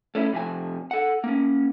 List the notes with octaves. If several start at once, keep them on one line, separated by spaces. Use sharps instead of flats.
A3 C#4 E4
F2 C3 F3 G#5
A4 F#5
A#3 C#4